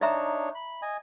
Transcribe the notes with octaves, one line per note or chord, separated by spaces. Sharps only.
D4 D#4 C#5 D#5 E5 A#5
B5
D#5 G#5